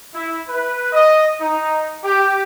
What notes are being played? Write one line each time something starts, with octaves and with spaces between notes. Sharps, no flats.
E4
B4
D#5
D#4
G4